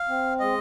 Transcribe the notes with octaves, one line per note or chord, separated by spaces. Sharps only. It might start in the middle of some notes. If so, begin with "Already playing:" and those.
Already playing: F5
C4
G#3 D#5